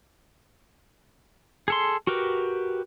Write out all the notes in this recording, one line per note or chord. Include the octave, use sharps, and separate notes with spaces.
G#4 A4 C6
F#4 G4 A#4 B4